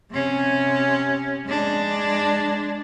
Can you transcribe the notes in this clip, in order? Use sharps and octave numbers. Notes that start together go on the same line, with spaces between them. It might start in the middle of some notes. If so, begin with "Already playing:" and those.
C3 C#4
G#3 D4